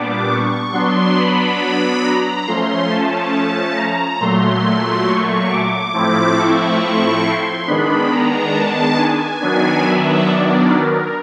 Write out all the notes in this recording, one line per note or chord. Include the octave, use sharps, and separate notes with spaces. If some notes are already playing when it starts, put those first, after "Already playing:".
Already playing: A#2 G3 B3 D4 D6
C#6
F#3 B3 D4 C6
B5
A#5
F3 A3 C#4 C6
A5
A#5
A#2 F#3 A3 C6
C#6
D6
A2 F3 A3 C4 E4
C#6
C6
D#3 G#3 B3 D4 B5
A#5
A5
G#5
D#3 F#3 B3 D4
E5
D5
A#4